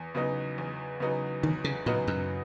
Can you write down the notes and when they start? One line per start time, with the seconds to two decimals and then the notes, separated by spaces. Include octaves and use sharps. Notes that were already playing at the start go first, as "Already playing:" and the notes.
Already playing: E2
0.15 C#3 F#3 B3 D#4
0.58 E2
1.00 C#3 F#3 B3 D#4
1.43 E2 D#3
1.64 C#3
1.86 A#2 C#3 F#3 B3 D#4
2.07 F#2